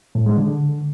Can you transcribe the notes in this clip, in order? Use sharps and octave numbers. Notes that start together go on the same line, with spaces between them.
A2
G#3
D3